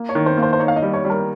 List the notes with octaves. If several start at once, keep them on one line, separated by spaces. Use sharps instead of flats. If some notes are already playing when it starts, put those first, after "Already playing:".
Already playing: A#3
C#5
D#3
C5
A#3
C5
C5
D#4 C#5
F5
D#5
G3
C#5
G3 A#4